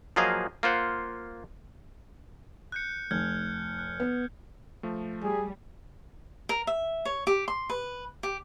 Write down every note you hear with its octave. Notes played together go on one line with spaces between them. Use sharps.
F3 F#3 A#3 G#4 D#5 F5
A#3 F4 C5 F#5
F#6 G6 C#7
F1 F6 G6 G#6
F#6
B3
F3 A3
G3 G#4
A#4
E5
C#5
G4
C6
B4
G4